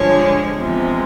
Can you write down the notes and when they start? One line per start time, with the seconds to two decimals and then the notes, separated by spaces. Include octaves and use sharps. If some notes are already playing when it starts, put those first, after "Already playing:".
Already playing: G2 D3 F3 G#3 C#5
0.55 E2 C3 F3 G#3